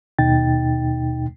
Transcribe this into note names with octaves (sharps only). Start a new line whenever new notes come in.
D#2 B2 D#4 G5 A6